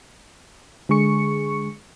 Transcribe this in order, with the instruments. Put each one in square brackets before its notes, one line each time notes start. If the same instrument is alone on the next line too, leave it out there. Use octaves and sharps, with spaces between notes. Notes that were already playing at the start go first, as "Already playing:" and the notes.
[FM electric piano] D3 G#3 G#4 C#6 C#7